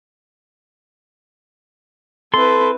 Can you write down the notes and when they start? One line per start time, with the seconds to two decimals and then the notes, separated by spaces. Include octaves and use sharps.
2.34 C4 E4 A4 B4 C6